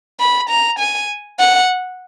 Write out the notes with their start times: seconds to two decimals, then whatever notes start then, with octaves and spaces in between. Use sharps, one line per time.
0.20 B5
0.49 A#5
0.79 G#5
1.40 F#5